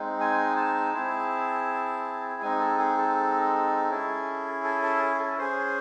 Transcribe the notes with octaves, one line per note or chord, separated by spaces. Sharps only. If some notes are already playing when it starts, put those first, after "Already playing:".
Already playing: G#3 C4 D#4
G#5
A5
C4 E4 G#4
G#3 C4 D#4 G#5
A4
G#4
A4
C#4 E4 G#4
A4
A4
G#4
A4
C#4 G#4 C5